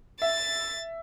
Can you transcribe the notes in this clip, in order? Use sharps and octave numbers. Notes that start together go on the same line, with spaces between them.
E5 A6